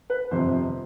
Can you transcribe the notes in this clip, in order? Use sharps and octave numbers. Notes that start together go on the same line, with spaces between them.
B4
G1 F2 C3 F3 C5